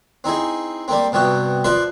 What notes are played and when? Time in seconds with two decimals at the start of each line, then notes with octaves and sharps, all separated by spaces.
0.24 C4 D#4 E4 G#4
0.88 G3 A#3 C4
1.12 G2 C3 B3 F#4 G5
1.64 F3 B4 D5 E5 C6